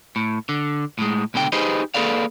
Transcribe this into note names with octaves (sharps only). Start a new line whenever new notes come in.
A2
D3
A2 G#3
C#2 B2 D3 G5
D#4 G4 G#4 B4 C5 D#5
A#3 G#4 A4 B4 D5 F5